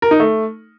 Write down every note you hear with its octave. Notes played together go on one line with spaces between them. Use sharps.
A#4
D#4
A3